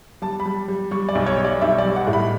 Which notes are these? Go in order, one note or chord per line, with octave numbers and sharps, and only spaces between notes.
G3 A5
B5
G3
G3
G3 C#6
D5
B1
C#5
G3
D5
B1 E5
D5
G3
F#5
A2
B5